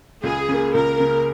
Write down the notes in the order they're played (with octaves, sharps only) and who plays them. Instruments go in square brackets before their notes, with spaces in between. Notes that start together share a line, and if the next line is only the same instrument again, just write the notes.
[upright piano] C#2 [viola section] G#4
[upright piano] C#3 A#3
[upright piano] C#2 [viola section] A#4
[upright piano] C#3 A#3